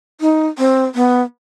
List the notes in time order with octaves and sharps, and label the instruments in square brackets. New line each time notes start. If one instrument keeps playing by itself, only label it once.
[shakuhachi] D#4
C4
B3